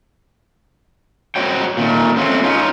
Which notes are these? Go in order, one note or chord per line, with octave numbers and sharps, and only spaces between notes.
F#4 C5 C#5 G5
A#2 D#3 A3
A3 C4 C#4 F4
C#4 D#4 F4